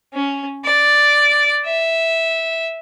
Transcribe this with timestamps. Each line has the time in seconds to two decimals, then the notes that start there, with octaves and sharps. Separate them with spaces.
0.13 C#4
0.64 D5
1.66 E5